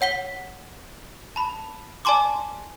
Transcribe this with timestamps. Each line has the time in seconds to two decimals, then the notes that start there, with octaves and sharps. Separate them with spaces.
0.01 C#5 F#5 B6 G7
1.36 A5 B5
2.05 D5 G#5 A5 C6 D6